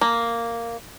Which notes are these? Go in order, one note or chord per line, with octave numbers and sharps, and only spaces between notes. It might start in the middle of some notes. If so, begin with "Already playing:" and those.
A#3